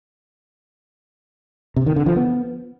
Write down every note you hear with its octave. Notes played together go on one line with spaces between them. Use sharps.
C3
D#3
D3
F3
B3